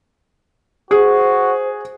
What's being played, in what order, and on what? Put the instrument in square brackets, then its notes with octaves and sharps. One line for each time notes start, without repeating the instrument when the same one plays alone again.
[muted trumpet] F#4 [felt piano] G#4 [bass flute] C5